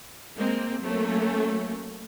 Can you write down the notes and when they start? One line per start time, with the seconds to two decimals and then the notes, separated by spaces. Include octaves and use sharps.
0.37 G#3 A#3 C4
0.82 F#3 A3 A#3 C#4